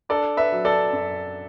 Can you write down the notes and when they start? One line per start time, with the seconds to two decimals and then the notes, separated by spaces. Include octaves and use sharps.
0.09 D4 A4 D5
0.37 B4 E5
0.52 F#3
0.65 A4 D5
0.93 F#2